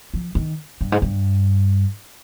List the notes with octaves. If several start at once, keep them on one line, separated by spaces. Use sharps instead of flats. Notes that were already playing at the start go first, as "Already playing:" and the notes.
F3
D#3
G2
G#2
G2